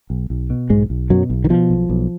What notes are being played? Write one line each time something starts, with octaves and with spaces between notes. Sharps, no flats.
B1
B1
B2
B1 G#2 G#3
B1
F#2 B2 F#3
B1
D#3
B2 F3
B1
B1